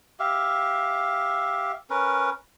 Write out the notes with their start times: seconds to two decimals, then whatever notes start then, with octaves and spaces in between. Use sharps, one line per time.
0.20 G4 E5 F5
1.90 C#4 A#4 B4